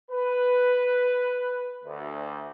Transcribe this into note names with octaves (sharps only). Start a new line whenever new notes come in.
B4
D2